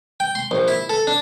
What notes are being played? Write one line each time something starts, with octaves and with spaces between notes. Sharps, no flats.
G5
C6
A#1
E4
A4
D4